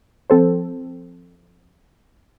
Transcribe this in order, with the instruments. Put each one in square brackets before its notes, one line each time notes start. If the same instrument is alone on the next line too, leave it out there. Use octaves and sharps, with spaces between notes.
[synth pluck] F3 C4 A4 C5